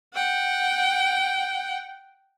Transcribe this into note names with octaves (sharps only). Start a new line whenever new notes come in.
F#5 G5